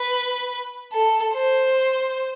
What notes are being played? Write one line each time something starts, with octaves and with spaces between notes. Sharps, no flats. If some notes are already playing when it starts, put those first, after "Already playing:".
Already playing: B4
A4
C5